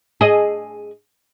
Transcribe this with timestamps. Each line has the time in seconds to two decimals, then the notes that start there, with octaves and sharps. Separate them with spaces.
0.21 G#4 D#5